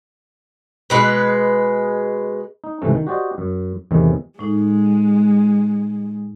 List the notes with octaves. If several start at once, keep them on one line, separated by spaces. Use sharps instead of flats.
B2 G#3 B4
D#4
C#2 G#2 C3 E3 A3
D#3
F#4 G4 C5 D5 D#5
F#2
E2 A2 C3 D#3 E3
A2 G#3 D#4